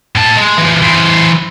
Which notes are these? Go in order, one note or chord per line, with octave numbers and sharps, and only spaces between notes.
A2 A5
G#3
E3 F3
E3 C5